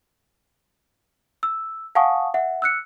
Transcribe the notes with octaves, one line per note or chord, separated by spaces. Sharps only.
E6
F5 F#5 G#5 A5 C#6 D#6
E5 F#5
E6 F#6 C#7